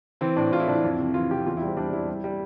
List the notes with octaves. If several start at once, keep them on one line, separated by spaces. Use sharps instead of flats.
E3 C4
A2 D4
A2 F4
E4
E3 D4
E4
F2
C3
E3 F4
C3 G4
E2 F4
E4
G3
C4
G3 D4
E2 E4
G3
G3